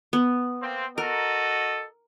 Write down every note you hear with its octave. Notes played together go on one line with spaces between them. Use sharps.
B3
A#3 C4
F#4 A4 A#4 D#5